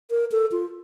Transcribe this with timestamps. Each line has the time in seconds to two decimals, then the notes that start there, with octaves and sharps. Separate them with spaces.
0.10 A#4
0.32 A4
0.52 F4